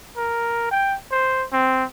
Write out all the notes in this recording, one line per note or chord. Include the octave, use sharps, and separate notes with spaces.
A#4
G5
C5
C4